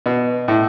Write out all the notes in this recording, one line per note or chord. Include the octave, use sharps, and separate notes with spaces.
B2
A2